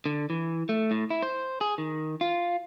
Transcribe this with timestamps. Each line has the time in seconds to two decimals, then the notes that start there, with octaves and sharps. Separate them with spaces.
0.06 D3
0.30 E3
0.69 A3
0.91 A2
1.10 E4
1.23 C5
1.61 G#4
1.78 D#3
2.21 F4